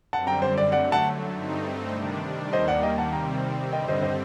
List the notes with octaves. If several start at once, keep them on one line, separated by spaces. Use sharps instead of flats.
F#2 D3 G3 C4 F#5 A5
G5 A#5
C5
D5
D3 F#3 A3 D5 F#5
F#5 A5
G2 D3 A3 C4 D#4
C3 D#3 G3 D4
D#2 D#3 G3 A#3 C5 D#5
D5 F#5
D#5 G5
F#5 A5
C3 D#3 G3 C4 G5 A#5
G2 D3 G3 C4 D#5 G5
C5 D#5
C5 D#5